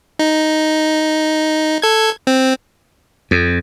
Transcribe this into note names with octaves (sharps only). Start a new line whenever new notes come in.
D#4
A4 G#6
C4
F2